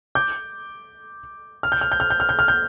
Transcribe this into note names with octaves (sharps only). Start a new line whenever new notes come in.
D6 G6
F6
G6
F6
G6
F6
G6
F6
G6
F6
G6